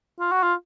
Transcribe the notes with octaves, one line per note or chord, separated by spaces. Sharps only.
F4
F#4
F4